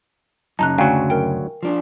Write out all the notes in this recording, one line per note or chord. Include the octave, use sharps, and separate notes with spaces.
F#2 C#3 D#4 A5 A#5 F#6
D2 F#3 F5 G5 G#5
A#4 G5
F3 D4